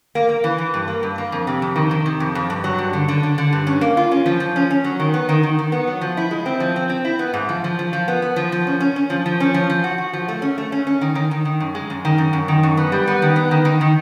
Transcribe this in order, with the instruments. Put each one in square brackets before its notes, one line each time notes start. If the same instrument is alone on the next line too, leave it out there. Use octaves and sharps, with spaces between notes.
[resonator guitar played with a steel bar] A#3
A#3
E3
E3
G2
A#3
G2
A#3
F2
C3
F2
D#3
D#3
C3
F2
F2
G2
F#3
G2
D3
D3
D3
D3
G2
C#4
A#3
F4
C#4
F3
F3
C#4
C#4
F#3
D#3
B3
D#3
D#3
D#3
B3
F#3
F3
E4
G#3
C4
F3
C4
C4
E4
B3
G#2
F3
F3
F3
F3
B3
B3
F3
F3
C#4
C#4
C#4
F3
F3
C#4
F3
F3
F#4
F#4
F3
A3
C#4
A3
C#4
C#4
D#3
D#3
D#3
D#3
F#2
G#3
F#2
D#3
F#2
F#2
D#3
F#2
B3
G3
B3
D#3
B3
D#3
D#3
D#3